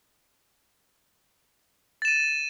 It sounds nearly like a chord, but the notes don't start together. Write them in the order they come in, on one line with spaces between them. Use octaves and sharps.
A6 E7 D#7